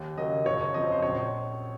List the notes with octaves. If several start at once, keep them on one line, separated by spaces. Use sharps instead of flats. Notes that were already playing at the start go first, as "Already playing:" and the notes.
Already playing: D#2
C#3 F#3 A#3 D#5
F#1 C#5
F#2 F3 C4 D#5
C5
A#1 C#5